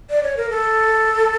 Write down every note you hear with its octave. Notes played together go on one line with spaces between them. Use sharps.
D5
C#5
A#4
A4